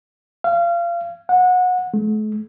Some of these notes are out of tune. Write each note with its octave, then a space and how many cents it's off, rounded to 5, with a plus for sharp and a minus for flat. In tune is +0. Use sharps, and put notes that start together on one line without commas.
F5 -25
F#5 -25
A3 -45